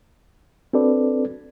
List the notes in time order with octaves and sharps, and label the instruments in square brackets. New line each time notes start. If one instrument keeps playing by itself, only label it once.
[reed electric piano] C4 D4 F#4 A4 B4 D5